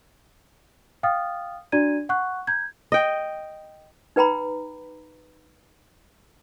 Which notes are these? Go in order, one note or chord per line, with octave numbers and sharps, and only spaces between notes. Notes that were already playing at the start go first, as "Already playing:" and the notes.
F5 G5 D#6 F6 A6
D4 F#4 D5 A#5 G#6 D#7
F#5 C#6 F#6
A#5 G6 G#6
D#5 G5
D#4 B4 G5 A#5 B5